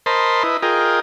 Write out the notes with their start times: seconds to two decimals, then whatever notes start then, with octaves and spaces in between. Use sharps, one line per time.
0.06 A#4 C5 D#5 A5 B5 C6
0.43 E4 B4 D#5
0.63 F4 G#4 A#4 D#5 G5